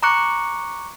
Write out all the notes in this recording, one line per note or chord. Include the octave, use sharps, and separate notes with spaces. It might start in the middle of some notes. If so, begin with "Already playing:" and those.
A#5 C#6 D6 F#6 C#7